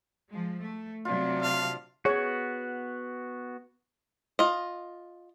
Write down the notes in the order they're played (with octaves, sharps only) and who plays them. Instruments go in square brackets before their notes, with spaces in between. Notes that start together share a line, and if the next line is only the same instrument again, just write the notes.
[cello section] F3 G#3
A3
[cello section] C3 F#3 D4 [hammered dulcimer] F4
[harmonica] F5 [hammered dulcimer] A5
[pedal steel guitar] B3 F#4 [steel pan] G#4 C#5
[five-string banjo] F4 D#5